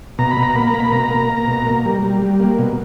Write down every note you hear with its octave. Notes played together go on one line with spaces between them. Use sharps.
B2 A#5
B5
B2
A#5
A#3 B5
A#5
A#3
B5
B2 A#5
A#3
A#3
B2
A#3
G3
G3
G3
A#3
B2